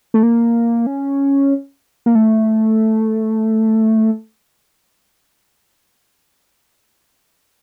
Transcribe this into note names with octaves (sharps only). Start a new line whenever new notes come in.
A3
A#3
C#4
A#3
A3